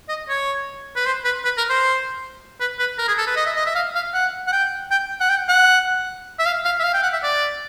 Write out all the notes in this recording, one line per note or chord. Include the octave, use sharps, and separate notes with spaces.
D#5
C#5
B4
C5
B4
B4
A#4
C5
B4
B4
A#4
G#4
A4
B4
D#5
E5
D#5
E5
F5
F5
F#5
F#5
G5
G5
F#5
G5
F#5
E5
F5
F5
E5
F5
G5
F#5
E5
D5